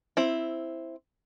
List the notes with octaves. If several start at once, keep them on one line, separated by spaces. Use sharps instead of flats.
C4 E4